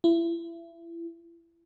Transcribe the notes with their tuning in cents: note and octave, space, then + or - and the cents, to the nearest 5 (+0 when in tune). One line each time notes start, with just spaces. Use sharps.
E4 +30